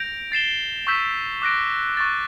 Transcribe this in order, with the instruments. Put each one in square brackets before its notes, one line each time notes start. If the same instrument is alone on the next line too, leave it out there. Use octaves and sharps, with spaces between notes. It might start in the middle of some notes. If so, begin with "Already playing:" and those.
Already playing: [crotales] G6 A#6 D7 F7
A6 C7 E7 G7
C#6 E6 G6 B6 E7
D6 F#6 A#6 D7
C#6 F#6 A6